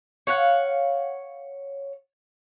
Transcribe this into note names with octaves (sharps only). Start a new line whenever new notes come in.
C#5 F5 F#5